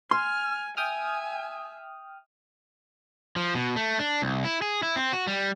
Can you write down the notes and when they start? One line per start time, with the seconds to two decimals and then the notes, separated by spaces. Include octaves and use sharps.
0.11 G#5 C6 F6
0.77 E5 G5 G#5 D#6 F6
3.36 F3
3.55 B2
3.76 A3
3.99 D4
4.22 C2
4.45 E4
4.62 G#4
4.83 E4
4.96 C4
5.13 F#4
5.27 G3